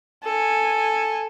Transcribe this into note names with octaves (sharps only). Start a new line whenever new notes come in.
A4 G#5